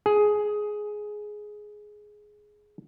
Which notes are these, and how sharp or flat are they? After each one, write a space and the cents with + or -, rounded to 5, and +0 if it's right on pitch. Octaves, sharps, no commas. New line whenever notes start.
G#4 +10